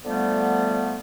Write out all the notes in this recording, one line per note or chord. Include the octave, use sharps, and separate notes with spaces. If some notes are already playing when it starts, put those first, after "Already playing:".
D3 F3 G3 A3 B3